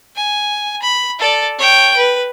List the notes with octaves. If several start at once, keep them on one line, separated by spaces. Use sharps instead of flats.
G#5
B5
A4 D5
C#5 G5
B4